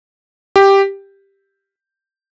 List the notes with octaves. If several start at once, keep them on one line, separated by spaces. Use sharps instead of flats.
G4